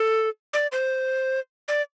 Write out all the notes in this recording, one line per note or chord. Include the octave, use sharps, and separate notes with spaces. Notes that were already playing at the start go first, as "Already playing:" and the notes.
Already playing: A4
D5
C5
D5